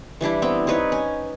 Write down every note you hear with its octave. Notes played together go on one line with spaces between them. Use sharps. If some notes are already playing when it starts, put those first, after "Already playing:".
E3 G3 D4 E4
B3 C4 E5 G5
C4 D#4 B4 C#5
C#4